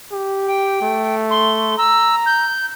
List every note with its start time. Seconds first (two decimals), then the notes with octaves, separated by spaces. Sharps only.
0.12 G4
0.47 G5
0.82 A3
1.30 C6
1.78 A#5 E6
2.26 G6